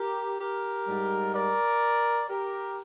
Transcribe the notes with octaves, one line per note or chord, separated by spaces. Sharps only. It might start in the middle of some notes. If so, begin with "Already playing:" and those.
Already playing: G4 A#4
G4 A#4
G#2 G3
A#4 D5
G4 A#4